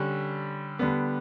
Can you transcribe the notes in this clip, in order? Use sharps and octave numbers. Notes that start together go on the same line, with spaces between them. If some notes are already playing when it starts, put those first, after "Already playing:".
Already playing: D3 G3 C#4
D3 G3 B3